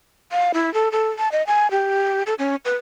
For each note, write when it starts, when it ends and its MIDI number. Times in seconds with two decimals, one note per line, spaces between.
0.32 0.52 77
0.54 0.73 64
0.74 0.92 69
0.92 1.08 69
1.19 1.31 81
1.32 1.45 75
1.47 1.70 80
1.71 2.23 67
2.27 2.34 69
2.39 2.56 61
2.65 2.75 71